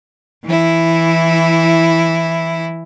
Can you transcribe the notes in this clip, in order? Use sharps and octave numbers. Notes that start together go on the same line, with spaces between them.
E3 E4